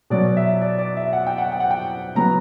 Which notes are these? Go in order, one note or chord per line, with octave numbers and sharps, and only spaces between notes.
B2 F#3 C#4 D5
E5
D5
D5
E5
F#5
G5
F#5
G5
F#5
G5
C#3 F#3 B3 A#5